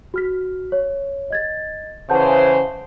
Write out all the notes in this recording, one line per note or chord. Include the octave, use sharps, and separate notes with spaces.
F#4 F6 B6
C#5
D#5 G#6 A6
C#3 E3 C5 F#5 A5 G6